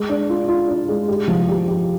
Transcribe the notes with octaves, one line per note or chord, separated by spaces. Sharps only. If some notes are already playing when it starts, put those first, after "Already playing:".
Already playing: G#3
D4
F4
F4
D4
G#3
G4
F3
G4
G4